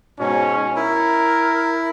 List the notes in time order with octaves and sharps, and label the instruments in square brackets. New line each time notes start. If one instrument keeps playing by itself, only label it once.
[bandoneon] G#2 B2 [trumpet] C#4
[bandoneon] E4 [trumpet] A#4